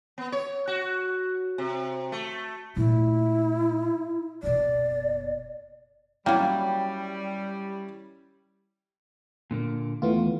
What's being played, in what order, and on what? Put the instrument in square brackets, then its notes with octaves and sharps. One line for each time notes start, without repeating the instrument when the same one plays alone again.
[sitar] B3
C#5
F#4
C3
A3
[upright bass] A#2 A3 [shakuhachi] E4
[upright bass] F#1 B2 [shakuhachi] D5
[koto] F#3 A#3 [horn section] G3 [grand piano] C#4 E4 [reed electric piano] G5
[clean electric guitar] A#2 D3 A#3
[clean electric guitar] D#2 [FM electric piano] E3 B3 F4 [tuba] A3